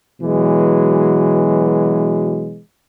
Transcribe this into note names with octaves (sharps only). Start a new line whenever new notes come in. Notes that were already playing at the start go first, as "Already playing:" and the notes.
B2 E3 F#3 G#3